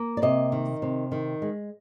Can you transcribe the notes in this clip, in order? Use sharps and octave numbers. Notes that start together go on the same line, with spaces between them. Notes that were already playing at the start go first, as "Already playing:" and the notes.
Already playing: A#3
D5
C3 D#5
D#3
C3
D#3
G#3